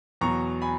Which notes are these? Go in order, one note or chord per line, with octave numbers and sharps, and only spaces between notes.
E2 B2 F#3 A#5 C#6
G#5 B5